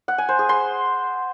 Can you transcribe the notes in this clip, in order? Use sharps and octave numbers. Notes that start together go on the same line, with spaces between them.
F#5
G#5
C5
G#4
C6